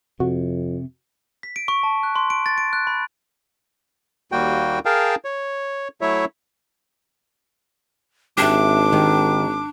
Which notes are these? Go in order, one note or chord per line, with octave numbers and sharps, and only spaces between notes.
F2 C3 F#4
B6
D7
C#6
A5
F#6
C6
D7
A6
D7
F#6
B5
D#2 G3 A#3 F#4 G5
G#4 A#4 F5 G5 A5
C#5
F#3 A3 E4 C#5 E5
G#1 D4 G4 E5 D6
D#3 G4